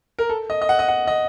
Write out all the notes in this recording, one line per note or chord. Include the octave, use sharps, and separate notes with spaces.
A#4
A4
D#5
D#5
F#5
D#5
F#5
D#5